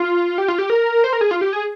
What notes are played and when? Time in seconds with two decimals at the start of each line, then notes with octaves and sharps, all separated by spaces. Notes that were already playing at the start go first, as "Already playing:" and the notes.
Already playing: F4
0.38 G4
0.48 F4
0.59 G4
0.70 A#4
1.04 C5
1.13 A#4
1.21 G#4
1.31 F4
1.41 G4
1.53 G#4